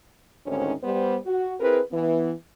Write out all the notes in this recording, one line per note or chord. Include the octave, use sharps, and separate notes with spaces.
D2 G#2 D#3 C4 C#4
G3 B3 C5
F#4
C4 E4 G#4 A#4 B4
E3 B3